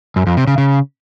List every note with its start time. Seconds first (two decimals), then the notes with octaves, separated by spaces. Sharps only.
0.16 F#2
0.27 F2
0.37 C3
0.47 C#3
0.58 C#3